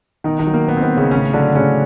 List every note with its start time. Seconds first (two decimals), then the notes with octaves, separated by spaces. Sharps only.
0.24 B2 D#3 D#4
0.39 D#3 D#4
0.47 F#3
0.54 A#3
0.68 B2 B3
0.77 C4
0.83 B3
0.90 F#3
0.97 C#3 C#4
1.11 A2 C#3 C#4
1.33 D3 F#3 D4
1.55 A2 C#3 C#4